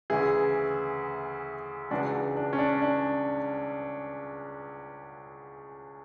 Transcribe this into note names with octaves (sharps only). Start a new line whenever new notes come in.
D2 C#3 E3 E4 G#4
C#2 C#3 E3 D4 F#4
D4
C#4
D4
D4